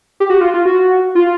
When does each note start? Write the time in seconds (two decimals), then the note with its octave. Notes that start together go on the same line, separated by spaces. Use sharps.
0.20 G4
0.30 F#4
0.41 F4
0.54 F4
0.66 F#4
1.15 F4